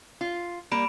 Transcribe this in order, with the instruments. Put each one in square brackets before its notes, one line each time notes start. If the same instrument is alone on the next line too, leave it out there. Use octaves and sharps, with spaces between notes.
[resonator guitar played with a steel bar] F4
[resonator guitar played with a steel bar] G3 A#3 [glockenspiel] B5 D7 E7